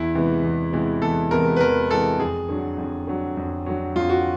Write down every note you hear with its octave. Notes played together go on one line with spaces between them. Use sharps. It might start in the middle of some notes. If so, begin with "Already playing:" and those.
Already playing: E2 E4
C3 E3 G#3 B3
E2
C3 E3 G#3 B3
E2 A4
C3 E3 G#3 B3 A#4
B4
E2 A#4
C3 E3 G#3 B3 A4
F2 G#4
D3 F#3
F2
D3 F#3
F2
D3 F#3
F2 F4
F#4